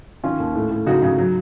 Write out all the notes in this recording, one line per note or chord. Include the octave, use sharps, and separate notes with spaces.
D#3 C#4 F4
D#2
A2
A2
C#3 D#4 F#4
C#3
F#3